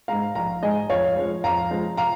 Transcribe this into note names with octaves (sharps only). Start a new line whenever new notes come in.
G#2 G#3 F5 A#5
A#1 F5 A#5
G#2 G#3 D#5 G#5
F2 C#5 F5
F3 G#3
F2 F5 A#5
F3 G#3
F5 A#5